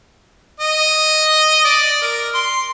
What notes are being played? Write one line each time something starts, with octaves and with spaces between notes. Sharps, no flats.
D#5
D5
A#4
C6